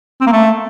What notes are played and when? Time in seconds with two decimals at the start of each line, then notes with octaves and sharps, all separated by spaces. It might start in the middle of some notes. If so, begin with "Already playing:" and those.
0.21 C4
0.27 A#3
0.33 A3